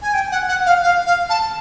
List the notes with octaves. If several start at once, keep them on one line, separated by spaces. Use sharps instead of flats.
G#5
G5
F#5
F#5
F5
F5
F5
A5